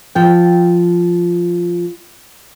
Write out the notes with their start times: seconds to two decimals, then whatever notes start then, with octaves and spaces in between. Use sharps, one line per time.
0.15 F3 G5